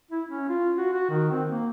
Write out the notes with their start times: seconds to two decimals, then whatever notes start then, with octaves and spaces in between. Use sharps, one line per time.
0.11 E4
0.29 C#4
0.49 F4
0.77 F#4
0.93 F#4
1.10 D#3
1.31 C4
1.50 A#3